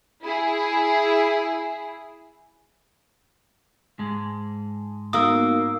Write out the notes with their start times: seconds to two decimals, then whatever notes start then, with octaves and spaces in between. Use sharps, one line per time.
0.24 E4 G#4
3.99 G#2 G#3 A5
5.13 A#3 B3 D#4 F#4 D#6 E6